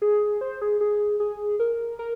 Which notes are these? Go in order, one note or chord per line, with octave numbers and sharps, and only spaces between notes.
G#4
C5
G#4
G#4
G#4
A#4
A#4